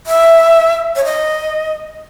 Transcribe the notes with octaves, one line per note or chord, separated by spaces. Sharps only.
E5
C#5
D#5